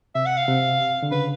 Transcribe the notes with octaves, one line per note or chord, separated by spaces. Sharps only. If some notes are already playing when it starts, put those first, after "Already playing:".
C3 E5
F#5
F5
C3
D3
C#3 B4